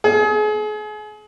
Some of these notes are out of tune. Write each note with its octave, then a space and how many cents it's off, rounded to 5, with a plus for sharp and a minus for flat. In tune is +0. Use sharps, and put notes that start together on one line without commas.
G#4 +35